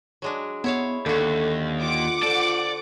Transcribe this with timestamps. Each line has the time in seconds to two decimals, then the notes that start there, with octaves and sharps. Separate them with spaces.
0.22 F#3 G#3 D4
0.64 B3 E4 C#5 F5
1.06 D#2 D3 F#4 A4
1.82 F4 F#5 D6
2.23 A4 C5 D5